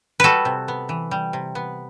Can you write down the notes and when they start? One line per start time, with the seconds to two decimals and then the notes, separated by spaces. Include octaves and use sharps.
0.20 G3 F#4 A4 B4
0.45 C3
0.68 B3
0.89 E3
1.11 G3
1.33 C3
1.55 B3